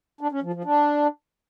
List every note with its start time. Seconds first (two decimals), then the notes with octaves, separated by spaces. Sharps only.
0.21 D4
0.32 C#4
0.43 F3
0.53 F3
0.64 D4